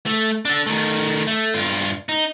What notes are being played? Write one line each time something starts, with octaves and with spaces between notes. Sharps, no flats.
A3
D4 A4
D#3 A3
A3
G2 F4
D#4